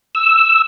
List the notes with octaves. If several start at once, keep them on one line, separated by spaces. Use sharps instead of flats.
E6